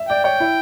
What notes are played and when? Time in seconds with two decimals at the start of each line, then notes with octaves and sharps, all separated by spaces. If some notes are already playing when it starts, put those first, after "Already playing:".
Already playing: E5
0.09 D5 G5
0.24 C#5 G5
0.40 E4